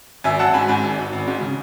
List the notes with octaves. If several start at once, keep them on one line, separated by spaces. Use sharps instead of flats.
G#1 E5 G#5
F#3 F#5 A5
G#2 G#5 B5
G#2 G#5 B5
G#1
G#1
G#1
G#2
C#3